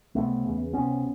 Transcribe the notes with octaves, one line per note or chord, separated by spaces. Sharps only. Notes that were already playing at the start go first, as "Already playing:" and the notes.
C#2 C3 A3 B3
E2 C#3
C#2 C3 B3 C#4